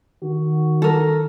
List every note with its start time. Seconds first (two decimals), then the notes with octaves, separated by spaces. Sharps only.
0.23 D#3 F#4
0.82 A4 A#4